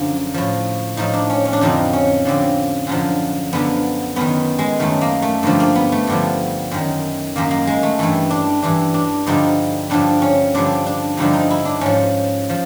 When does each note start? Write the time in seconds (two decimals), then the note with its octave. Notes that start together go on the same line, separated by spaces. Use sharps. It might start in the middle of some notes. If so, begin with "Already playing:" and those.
Already playing: F#2 D3 F3
0.34 A2 F3
0.97 A2 F3 D#4
1.13 D4
1.30 C#4
1.45 C#4
1.53 D4
1.61 F2 D3 F3 D#4
1.93 C#4
2.25 F2 D3 F3
2.87 F#2 D3 F3
3.53 F#2 D3 F3 B3
4.16 F#2 D#3 B3
4.59 G#3
4.79 F#2 D#3 A3
5.01 A#3
5.22 A3
5.43 G2 D3 F3 A3
5.60 A#3
5.75 B3
5.92 A3
6.07 G2 D3 F3
6.71 F#2 D#3
7.36 F#2 D#3 A#3
7.51 A#3
7.67 G#3
7.83 A3
7.99 G2 E3 A3
8.30 D4
8.62 G2 E3 D4
8.94 D4
9.27 G2 D3 F3 D#4
9.90 G2 D3 F3 D4
10.22 C#4
10.55 G2 D3 F3 D4
10.86 D4
11.17 G2 D3 F3 D#4
11.33 D#4
11.50 E4
11.65 D4
11.81 G#2 F3 C#4
12.50 F3